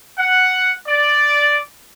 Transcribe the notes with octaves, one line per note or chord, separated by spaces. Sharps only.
F#5
D5